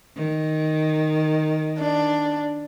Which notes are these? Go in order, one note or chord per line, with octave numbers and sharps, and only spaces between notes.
D#3
D4